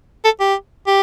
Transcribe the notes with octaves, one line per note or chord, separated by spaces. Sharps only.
A4
G4
G4